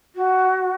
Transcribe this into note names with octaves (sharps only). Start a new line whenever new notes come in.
F#4